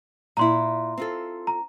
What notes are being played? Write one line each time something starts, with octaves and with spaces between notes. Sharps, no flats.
A#2 E4 A#5 C6
C4 F4 A4
A#5